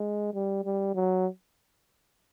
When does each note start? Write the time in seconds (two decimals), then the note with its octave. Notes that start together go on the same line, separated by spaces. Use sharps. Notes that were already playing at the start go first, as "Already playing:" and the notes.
Already playing: G#3
0.34 G3
0.65 G3
0.95 F#3